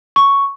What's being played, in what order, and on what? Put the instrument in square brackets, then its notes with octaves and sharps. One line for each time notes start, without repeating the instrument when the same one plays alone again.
[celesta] C#6